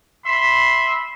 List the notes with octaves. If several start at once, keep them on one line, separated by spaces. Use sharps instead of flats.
E5 B5 C6